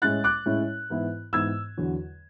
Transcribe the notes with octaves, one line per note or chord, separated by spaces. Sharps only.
A2 G#3 C#4 E4 F#6 A6
D6 F#6
A2 G#3 C#4 E4
G#2 E3 B3 E4
G#2 E3 B3 E4 E6 G#6
E2 D3 F#3